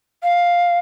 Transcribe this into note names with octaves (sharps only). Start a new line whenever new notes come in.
F5